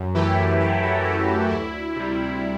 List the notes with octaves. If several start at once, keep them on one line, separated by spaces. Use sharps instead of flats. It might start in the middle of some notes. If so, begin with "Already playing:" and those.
Already playing: F#2
E3 A3 E4 G4
F#2 E4 G4
F#4 A4
E3 A3 E4
D2 E4
C3 G3